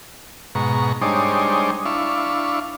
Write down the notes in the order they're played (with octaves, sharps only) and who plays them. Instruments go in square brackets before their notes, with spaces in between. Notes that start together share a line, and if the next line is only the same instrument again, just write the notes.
[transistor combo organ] G#2 B2 A#5 C#6
G3 G#3 D4 D#4 C5 C#5
D4 E4 F5 C#6